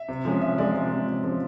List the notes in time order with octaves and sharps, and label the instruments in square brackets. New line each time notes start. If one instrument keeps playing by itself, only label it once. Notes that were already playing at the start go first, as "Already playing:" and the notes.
Already playing: [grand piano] E5
C3
F3 G#3 C#4
C3 E5
F3 G#3 C#4 D5
C3
F3 G#3 C#4
C3
F3 G#3 C#4